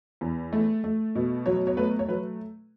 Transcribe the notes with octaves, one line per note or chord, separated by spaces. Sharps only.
E2
A3
A3
B2
F#3 C#5
C#5
A3 B4
C#5
F#3 B4